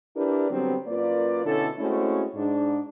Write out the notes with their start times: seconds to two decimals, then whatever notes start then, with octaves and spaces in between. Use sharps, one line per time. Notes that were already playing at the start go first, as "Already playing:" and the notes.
0.17 D4 E4 G4 A#4 B4 D5
0.51 D3 F#3 G3 B3 C4
0.87 F#2 A#3 F4 B4 D5
1.46 B2 D3 C#4 E4 A4
1.79 G#3 A3 C4 C#4 E4 F#4
2.35 G#2 D4